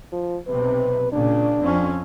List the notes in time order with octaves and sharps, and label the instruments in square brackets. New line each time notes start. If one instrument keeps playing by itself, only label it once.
[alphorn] F3
[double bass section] B1 C3 [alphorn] B4
[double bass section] A#2 C#3 [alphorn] D4
[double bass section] F2 C4 C#4